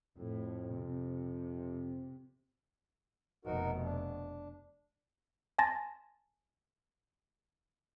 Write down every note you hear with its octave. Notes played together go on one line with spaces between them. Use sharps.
F2 A2
C3
F1 B2 D#4 F#4 A#4
D4
G#5 A5 C6 A6 A#6